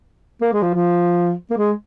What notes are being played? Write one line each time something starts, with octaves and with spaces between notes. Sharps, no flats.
A#3
G#3
F3
F3
A#3
G#3